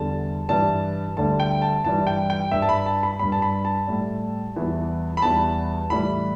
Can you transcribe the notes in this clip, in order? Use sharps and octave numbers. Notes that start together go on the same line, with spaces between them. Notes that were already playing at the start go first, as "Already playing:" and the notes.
Already playing: E2 D3 G3 A5
G2 E3 G3 A5
D2 D3 G3 A5
G5
A5
G2 E3 G3 A5
G5
G5
G2 G3 E5
A5
B5
A5
B5
G2 G3 B5
A5
B5
A5
A2 G3
E2 E3 G3
B5
E2 E3 G3 A5
A2 E3 G3 B5